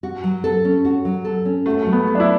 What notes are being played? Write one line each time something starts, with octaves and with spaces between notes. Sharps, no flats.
F#4
F#3
A4
C#4
F#4
F#3
A4
C#4
A3 F#4
F#3 A3
B3
A4
D4
E4